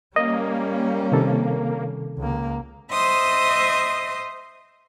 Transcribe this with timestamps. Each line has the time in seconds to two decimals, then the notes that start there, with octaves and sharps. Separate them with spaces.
0.16 G3 A#3 C#4 D#5
1.12 C3 D#3 A4
2.18 C#2 A#3
2.92 C5 D#5 E5 C6 D#6